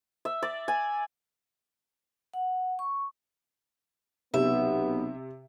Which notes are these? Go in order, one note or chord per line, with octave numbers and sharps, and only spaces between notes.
E5
D5
G#5
F#5
C#6
B1 C3 B3 E5